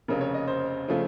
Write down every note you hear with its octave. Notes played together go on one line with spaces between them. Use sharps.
F1 F2 C#3 A#4
C#5
D#5
C5
C#3 F3 A3